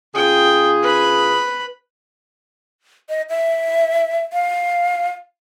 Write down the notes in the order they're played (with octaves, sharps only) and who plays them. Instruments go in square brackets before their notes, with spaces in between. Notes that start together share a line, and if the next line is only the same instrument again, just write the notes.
[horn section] C#3 F4 G#4 [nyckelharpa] G5
[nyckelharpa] B4 B5
[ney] D#5
E5
F5